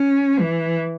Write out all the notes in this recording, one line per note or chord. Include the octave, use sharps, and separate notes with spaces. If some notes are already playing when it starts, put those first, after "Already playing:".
Already playing: C#4
E3